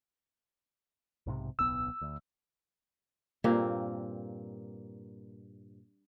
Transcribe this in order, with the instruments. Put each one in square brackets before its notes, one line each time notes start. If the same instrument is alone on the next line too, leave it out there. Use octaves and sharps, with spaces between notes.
[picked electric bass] B1 G#2 C3
[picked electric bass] D1 B1 B3 [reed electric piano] E6
[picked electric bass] D2
[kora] G2 A#2 A#3 C4